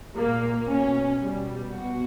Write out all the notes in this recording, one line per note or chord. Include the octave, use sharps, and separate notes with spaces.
A#2 A#3
B2 C#4
B2 G3
B2 F#4